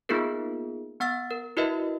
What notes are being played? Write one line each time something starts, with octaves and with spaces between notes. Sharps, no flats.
A#3 B3 D#4 F4 G#4 A#4
B3 F#5 E6 A6
A#4
E4 F#4 A#4 B4 D#5 E5